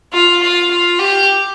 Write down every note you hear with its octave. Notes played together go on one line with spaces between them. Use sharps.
F4
F4
F4
G4